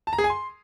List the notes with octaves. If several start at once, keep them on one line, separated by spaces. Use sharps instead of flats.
A5
A#5
G#4
G#5
C6